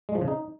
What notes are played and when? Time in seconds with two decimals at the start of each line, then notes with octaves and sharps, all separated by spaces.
0.09 G#3
0.15 F3
0.21 C#3
0.28 D#4